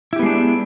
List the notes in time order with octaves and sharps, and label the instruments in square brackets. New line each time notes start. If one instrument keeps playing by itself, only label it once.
[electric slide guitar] E4
G4
B3
G#3
D4